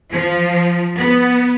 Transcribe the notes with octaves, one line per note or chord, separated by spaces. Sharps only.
F3
B3